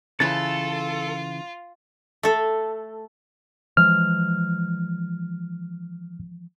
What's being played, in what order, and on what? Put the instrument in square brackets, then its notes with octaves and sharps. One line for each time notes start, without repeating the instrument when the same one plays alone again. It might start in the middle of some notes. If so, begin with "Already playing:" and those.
[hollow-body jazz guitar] C#3 E3 [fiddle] F4 [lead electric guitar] A4 [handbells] A6
[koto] A3 A4
[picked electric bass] E3 F3 G#3 [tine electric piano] F6